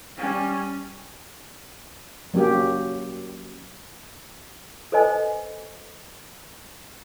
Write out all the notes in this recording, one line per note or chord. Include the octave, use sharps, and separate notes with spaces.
G3 C#4
F#3 A#3 C#4 G4
A4 B4 C5 D#5 G#5